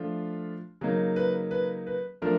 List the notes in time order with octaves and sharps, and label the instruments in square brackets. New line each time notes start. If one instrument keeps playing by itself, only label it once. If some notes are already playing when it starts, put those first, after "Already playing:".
Already playing: [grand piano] F3 A3 D4 F4
C#3 F#3 A#3 D#4
B4
B4
B4
F3 A3 D4 F4 A#4